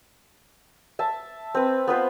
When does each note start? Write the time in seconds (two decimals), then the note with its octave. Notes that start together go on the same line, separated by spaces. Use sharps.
0.99 E5 A5
1.55 C4 B4
1.87 B3 F4 B4 C5